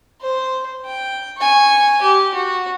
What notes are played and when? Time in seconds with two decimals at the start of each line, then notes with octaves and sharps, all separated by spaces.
0.21 C5
0.85 G5
1.38 G#5 C#6
2.02 G4
2.34 F#4